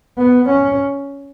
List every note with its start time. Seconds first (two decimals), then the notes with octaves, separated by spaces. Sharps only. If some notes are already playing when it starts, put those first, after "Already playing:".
0.18 B3
0.49 C#4